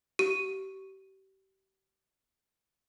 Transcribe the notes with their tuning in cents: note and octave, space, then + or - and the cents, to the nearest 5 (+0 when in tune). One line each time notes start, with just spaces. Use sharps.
G4 -35